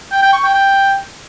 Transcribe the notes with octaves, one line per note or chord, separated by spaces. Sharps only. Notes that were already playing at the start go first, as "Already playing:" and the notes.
G5
G5
C#6
G5
G5